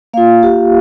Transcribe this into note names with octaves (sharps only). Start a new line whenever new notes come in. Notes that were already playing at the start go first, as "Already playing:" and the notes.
A#3 F4 F5
G4